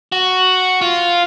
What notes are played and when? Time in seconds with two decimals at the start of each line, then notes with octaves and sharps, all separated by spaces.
0.12 F#4
0.82 F4